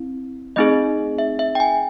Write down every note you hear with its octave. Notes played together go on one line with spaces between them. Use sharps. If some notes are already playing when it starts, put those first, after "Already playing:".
Already playing: C4 E4
A3 C4 D#4 G#4 D#5
E5
E5
G5
G#5